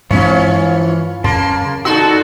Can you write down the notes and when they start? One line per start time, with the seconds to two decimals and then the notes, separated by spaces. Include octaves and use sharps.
0.11 G2 E3 F3 G#3 C4 C#4 F4 C#5
1.24 F#2 C#3 A#3 A5 C6
1.85 D#4 F#4 A4 D5 C6 E6